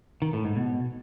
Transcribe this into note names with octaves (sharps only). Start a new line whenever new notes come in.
D#3
A2
G#2
B2